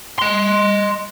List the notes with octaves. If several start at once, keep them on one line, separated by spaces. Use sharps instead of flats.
D#5 C6